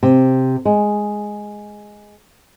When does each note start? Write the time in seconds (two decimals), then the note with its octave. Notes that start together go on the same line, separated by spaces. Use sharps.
0.03 C3
0.65 G#3